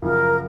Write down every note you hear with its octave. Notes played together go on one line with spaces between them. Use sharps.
F#2 C#3 F3 A#4